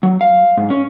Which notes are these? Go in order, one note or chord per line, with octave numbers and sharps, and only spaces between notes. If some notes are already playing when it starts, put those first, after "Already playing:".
F#3
F5
G#2
C#4